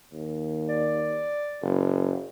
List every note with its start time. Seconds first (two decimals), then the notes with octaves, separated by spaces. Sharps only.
0.12 D#2
0.69 D5
1.62 F#1